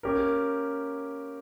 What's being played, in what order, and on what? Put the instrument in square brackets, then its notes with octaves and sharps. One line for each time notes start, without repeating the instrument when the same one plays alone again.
[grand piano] A#3 C#4 G4 A#4